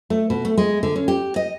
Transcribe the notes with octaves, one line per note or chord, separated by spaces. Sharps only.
A3
B2
A3
G#3
D3
C#4
G4
D#5